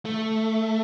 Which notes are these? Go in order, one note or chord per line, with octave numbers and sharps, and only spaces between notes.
A3